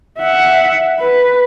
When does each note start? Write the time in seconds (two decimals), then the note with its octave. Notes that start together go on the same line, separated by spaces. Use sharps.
0.19 E5 F#5
0.99 B4